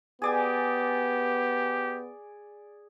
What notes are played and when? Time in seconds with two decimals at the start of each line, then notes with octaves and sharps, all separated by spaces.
0.22 B3 G4 G#4 D5 G#5